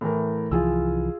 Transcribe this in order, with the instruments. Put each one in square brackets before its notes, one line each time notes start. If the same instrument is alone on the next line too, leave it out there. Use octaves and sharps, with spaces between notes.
[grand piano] A2 E3 A#4
[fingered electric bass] C2 E3 F3 [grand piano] F4 G#4 E6